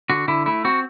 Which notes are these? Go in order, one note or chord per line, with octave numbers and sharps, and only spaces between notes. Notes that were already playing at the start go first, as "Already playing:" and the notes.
D3 F#4
D3 E4
A3 E4
C4 F#4